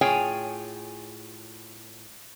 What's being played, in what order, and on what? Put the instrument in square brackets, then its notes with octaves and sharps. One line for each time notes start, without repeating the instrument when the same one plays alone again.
[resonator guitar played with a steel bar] A2 F4 G#4 C#5 G5 G#5